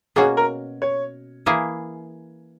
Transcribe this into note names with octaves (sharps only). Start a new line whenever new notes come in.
B2 A#3 C#4 F#4 G#4
A#4
C#5
E3 A#3 E4 G#4